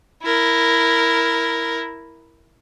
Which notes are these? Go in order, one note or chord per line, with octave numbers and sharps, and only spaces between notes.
E4 A#4